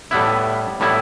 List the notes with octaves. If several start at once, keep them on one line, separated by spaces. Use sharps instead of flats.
A2 G3 B3 E4
A2 G3 B3 E4